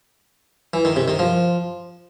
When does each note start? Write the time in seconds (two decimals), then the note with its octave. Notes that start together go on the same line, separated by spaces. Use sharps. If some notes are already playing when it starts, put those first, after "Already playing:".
0.74 E3
0.85 D#3
0.96 C3
1.08 D#3
1.19 F3